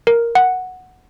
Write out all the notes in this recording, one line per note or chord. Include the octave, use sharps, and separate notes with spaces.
A#4
F#5